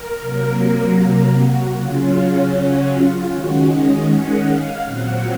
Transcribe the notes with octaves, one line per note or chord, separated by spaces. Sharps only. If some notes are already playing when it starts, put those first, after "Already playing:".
Already playing: A#4
C3 F#3 A#3
A#4
F#4
C#3 F#3 C#4 F4
F#4
F4
D#3 G#3 C#4 F#4
D#5
F#5
F5
A#2 F#3 C4 F#5